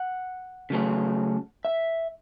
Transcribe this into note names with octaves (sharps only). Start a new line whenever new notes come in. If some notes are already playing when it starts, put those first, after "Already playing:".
Already playing: F#5
C#3 F#3 A3 C#4
E5